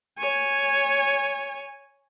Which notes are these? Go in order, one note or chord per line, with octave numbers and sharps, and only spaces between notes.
C#5 G#5